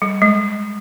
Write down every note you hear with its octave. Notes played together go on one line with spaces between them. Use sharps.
G3
G#3